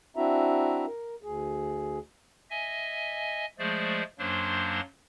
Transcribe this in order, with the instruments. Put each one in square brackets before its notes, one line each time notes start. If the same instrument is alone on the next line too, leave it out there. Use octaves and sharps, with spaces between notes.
[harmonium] C4 D4 E4 F#4 E5 A#5
A#4
D2 G#4
[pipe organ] D#5 E5 G#5
F3 G#3 A3 G#4 C5 D5
F#2 F#3 A#3 D4 C5 C6